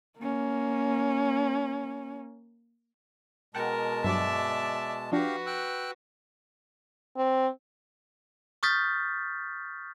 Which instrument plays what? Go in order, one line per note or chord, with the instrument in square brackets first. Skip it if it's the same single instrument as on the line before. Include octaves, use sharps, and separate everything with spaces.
[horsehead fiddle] A#3 C#4
[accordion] B2 G#3 A5 [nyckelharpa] A#4 [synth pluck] F#5 G5
[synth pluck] G2 F#3 [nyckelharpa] D5 E5
[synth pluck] F3 D4 [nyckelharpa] F#4 B4 [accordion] G4 F5
[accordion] G5 E6 F#6
[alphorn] C4
[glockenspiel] C#6 D#6 F6 G6 A6 B6